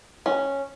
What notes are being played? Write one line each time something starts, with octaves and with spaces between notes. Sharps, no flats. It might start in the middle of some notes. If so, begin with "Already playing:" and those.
C#4